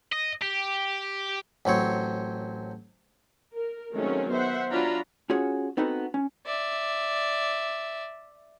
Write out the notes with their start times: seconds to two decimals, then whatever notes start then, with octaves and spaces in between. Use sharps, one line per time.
0.12 D#5
0.42 G4
1.65 A1 F#3 C4 C#5
3.54 A#4
3.94 D#3 F#3 G#3 A3 C4 C#4
4.31 B3 C5 E5 F#5
4.70 F#3 D4 F4 C#5 A#5 B5
5.30 C#4 F4 F#4 G#4 C#5
5.77 B3 C4 D#4 F#4 A4 B4
6.14 C#4
6.46 D5 E5